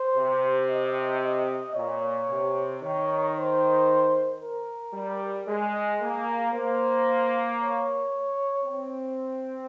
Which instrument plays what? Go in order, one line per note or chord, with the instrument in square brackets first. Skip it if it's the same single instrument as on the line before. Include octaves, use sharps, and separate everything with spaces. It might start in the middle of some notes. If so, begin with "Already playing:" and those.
Already playing: [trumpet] C5
[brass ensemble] C3
[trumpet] D#5
D#5
[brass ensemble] A#2 [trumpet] C#5
[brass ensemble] C3
[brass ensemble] D#3 [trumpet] C#5
[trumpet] C5
A#4
[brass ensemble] G3
[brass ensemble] G#3 [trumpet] G#4
[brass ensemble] A#3
[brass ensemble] A#3 [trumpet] C5
[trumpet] C#5
[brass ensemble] C4